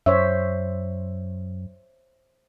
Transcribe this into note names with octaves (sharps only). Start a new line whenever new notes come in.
F#2 C5 C#5 E5